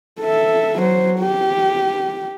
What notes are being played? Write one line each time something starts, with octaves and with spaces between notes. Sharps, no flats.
A4 E5
F#3 C5
G4